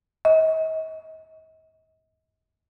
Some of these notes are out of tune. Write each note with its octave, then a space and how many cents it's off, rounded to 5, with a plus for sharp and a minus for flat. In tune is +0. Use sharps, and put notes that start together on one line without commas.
D#5 +40